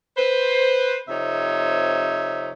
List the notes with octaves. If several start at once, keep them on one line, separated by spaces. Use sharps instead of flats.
B4 C5
F2 C3 D#4 C#5 E5